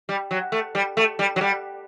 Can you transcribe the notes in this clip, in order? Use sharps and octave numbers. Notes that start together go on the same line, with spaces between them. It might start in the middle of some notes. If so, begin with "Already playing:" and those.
G3
F#3
A3
G3
A3
G3
F#3
G3